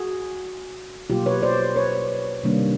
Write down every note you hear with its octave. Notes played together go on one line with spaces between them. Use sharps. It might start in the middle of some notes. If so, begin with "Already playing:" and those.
Already playing: F#4 G#4
B2 F#3 A#3 F4 G4
B4 C#5
C5 D5
B4 C#5
C3 D#3 G3 A#3 D4